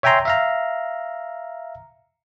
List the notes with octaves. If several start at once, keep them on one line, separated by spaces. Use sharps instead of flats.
C#5 E5 G5 G#5 A#5 C6
E5 F5 A#5